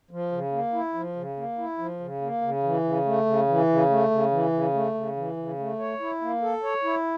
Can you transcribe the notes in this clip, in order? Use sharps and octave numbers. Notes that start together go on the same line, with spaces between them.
F3
C#3
A#3
E4
F3
C#3
A#3
E4
F3
C#3
A#3
C#3
E3
C#3
A3
C#3
E3
C#3
A3
C#3
E3
C#3
A3
C#3
E3
C#3
A3
C#5
E4
A#3
A4
C#5
E4